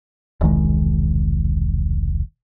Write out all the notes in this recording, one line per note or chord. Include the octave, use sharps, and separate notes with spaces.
E1 C2 D#3 G#3